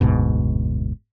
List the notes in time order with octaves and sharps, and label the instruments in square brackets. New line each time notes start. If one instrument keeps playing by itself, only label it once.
[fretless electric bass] F#1 D2 G#2 B2